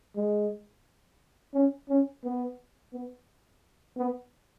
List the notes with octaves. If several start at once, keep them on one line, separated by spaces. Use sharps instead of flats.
G#3
C#4
C#4
B3
B3
B3